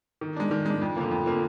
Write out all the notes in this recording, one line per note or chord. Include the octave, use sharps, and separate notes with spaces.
D#3
G#3 D4
D#3
G#3 D4
F2
D3 F3 A#3
F2
D3 F3 A#3